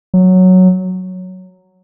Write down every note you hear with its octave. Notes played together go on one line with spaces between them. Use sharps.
F#3